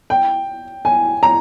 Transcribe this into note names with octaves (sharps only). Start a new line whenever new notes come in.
G5
G#5
A#5